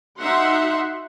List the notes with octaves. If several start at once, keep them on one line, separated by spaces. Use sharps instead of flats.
D#4 F#4 E5 F#5 C6